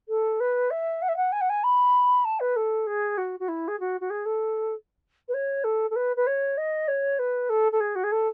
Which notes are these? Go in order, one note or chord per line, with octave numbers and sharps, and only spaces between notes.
A4
B4
E5
F#5
E5
F#5
G#5
F#5
G#5
B5
A5
B4
A4
G#4
F#4
F#4
E4
G#4
F#4
F#4
G#4
A4
B4
C#5
A4
A4
B4
B4
C#5
D#5
C#5
B4
A4
A4
G#4
F#4
G#4
A4